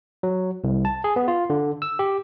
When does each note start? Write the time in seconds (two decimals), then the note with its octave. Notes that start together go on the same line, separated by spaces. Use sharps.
0.23 F#3
0.64 C2
0.85 A5
1.04 G#4
1.16 B3
1.28 F4
1.50 D3
1.82 E6
1.99 G4